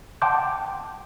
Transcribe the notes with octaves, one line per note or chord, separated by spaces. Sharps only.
F#5 G5 A5 C6 D6 G6